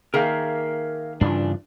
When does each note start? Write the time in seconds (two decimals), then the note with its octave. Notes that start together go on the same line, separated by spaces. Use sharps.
0.14 D#3 A#3 G#4 A#4 E5 F5
1.21 G2 C#3 E3 D4 F4